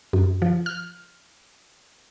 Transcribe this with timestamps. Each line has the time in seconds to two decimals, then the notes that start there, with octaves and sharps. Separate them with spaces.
0.13 F#2
0.42 F3
0.66 F6